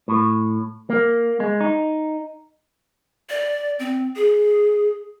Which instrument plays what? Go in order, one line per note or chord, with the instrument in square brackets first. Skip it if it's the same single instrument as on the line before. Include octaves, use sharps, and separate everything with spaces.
[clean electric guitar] A2
A#3
G#3
D#4
[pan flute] D5
C4
G#4